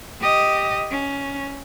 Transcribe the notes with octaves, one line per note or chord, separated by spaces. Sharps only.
G4 D#5
C#4